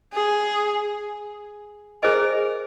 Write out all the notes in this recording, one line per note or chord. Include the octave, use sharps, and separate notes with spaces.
G#4
G#4 A#4 C5 D#5 G#5